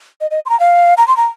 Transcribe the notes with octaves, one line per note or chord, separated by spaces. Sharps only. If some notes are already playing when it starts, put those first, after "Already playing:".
D#5
D#5
C6
A#5
F5
A#5
C6
A#5